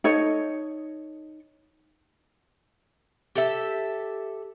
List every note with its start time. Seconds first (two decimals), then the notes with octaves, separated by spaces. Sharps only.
0.04 D#4 A4 C#5 D#5
3.35 G4 A4 E5